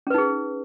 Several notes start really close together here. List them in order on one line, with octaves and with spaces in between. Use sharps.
C#4 B4 D#4 G#4